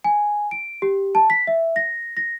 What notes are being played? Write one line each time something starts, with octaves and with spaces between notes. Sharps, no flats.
G#5
D7
G4
A5
B6
E5
A#6
A#6